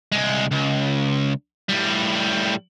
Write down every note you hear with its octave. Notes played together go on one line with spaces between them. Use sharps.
C2 G#3
C#2
A2 G3